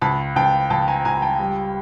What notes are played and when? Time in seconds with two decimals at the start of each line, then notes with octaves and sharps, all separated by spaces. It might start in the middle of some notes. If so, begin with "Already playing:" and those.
0.01 C#2 A5 B5
0.36 C#2 G5 A5
0.70 C#2 G5 A5
0.88 G#5 A#5
1.05 C#2 G#5 A#5
1.22 G5 A5
1.39 G3